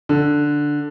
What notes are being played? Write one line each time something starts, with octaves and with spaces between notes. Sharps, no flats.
D3